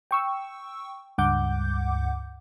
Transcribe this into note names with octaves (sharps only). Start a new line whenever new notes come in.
G5 C#6 E6
C#2 G2 F#5 D6 G6